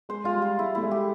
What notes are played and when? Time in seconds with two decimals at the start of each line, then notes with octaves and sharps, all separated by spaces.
0.09 G#3 C5
0.24 G#3 F4
0.34 G3
0.42 F4
0.58 G#3 E4
0.75 A3 E4
0.83 G#3
0.91 G4